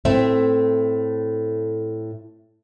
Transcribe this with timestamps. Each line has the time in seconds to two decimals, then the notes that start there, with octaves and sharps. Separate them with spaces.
0.05 A2 A3 C4 E5